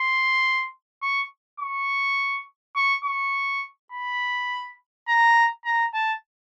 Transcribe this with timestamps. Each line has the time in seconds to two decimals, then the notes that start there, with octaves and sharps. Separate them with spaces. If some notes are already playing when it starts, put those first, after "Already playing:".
Already playing: C6
1.02 C#6
1.60 C#6
2.76 C#6
3.05 C#6
3.92 B5
5.08 A#5
5.65 A#5
5.94 A5